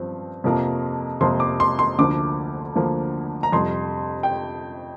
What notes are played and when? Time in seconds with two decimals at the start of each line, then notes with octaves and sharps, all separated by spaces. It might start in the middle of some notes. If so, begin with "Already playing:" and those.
Already playing: G2 F3 C4
0.44 F2 C3 F3 A#3
1.21 F2 C3 F3 A#3 C6
1.40 D6
1.60 C6
1.79 C6
1.98 D2 D3 F3 A#3 D6
2.75 D2 D3 F3 A#3
3.43 A#5
3.52 F2 C3 G3 C6
4.23 G5